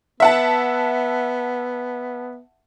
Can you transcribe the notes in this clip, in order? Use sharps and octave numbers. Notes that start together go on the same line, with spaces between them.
B3 E5 F#5 A5